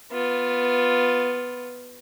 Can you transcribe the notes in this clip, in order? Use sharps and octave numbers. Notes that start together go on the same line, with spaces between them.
B3 F4